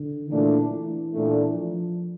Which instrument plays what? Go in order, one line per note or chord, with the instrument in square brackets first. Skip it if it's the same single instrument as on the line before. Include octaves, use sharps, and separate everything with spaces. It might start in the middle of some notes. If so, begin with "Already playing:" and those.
Already playing: [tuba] D3
[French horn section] A#2 A3 D4 [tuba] E3
[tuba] E3
[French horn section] A#2 A3 D4
[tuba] F3